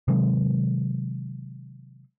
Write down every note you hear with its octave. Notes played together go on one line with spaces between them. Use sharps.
C3 D#3 F#3 G#3